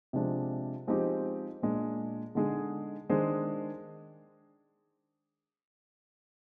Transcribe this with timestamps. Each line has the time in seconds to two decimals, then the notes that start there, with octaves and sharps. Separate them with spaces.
0.13 C3 F3 G#3 D4
0.87 F3 G#3 C4 D#4 G4
1.62 A#2 G#3 D4
2.35 D3 G#3 D#4 G#4
3.09 D#3 G#3 D4 G#4 C5